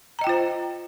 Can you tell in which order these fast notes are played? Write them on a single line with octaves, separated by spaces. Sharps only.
A#5 D#5 G5 F4 C5